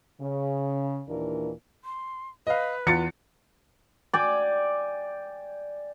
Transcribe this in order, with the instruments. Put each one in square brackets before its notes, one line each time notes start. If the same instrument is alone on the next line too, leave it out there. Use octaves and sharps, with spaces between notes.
[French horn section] C#3
D#2 A#2 E3 D4 A#4
[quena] C6
[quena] B4 [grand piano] D#5 F5
[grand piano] E2 F4 A6 [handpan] E3 [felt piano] C#7
[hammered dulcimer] D5 G5 G#5